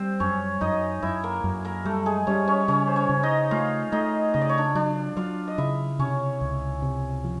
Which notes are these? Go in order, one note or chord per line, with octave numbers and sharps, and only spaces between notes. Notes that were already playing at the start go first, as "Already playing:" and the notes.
Already playing: G3 C4 C5
F#2 C#4 C#5
F#2 D#4 D#5
F#2 E4 E5
A#3 A#4
F#2
A#3 A#4
G3 A3 A4
G#3 G#4
G3 C#4 C#5
C#4 C#5
C#3 C#4 C#5
C5
C#4 C#5
C#3
D#4 D#5
A3 F4 F5
A3 D#4 D#5
C#3 D#5
D5
C#5
D4 D5
F#3 D4 D5
F#3 F4 F5
D#5
C#3 E4 E5
C3 C#4 C#5
C#2
C3
F3